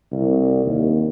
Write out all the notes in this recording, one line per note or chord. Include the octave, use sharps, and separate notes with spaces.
C2
D#2